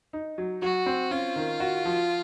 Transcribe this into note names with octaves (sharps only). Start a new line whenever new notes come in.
D#4
F#3
F#3 F#4
C4
C#4 F4
D#3
F#4
F3